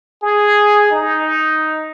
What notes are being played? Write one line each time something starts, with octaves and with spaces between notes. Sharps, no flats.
G#4
D#4